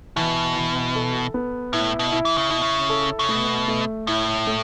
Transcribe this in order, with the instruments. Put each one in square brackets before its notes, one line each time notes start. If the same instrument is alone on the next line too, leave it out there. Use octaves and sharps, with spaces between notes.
[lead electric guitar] B2 [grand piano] E3
[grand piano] E3
A4
B3
[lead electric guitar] A2 [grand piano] E4
[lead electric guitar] B2
[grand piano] E4
[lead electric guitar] E3
C#3
[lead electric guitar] B2 [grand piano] E4
[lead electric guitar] C#3
[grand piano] A4
[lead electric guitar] C#3
[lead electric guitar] B2 [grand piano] A3
[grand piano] A3
[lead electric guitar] A2 [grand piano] E4
[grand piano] A3